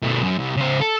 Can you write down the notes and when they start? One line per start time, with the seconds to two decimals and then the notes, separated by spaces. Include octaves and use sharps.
0.04 B2 A3
0.22 F#2
0.39 C2
0.57 C#3 C5
0.81 A4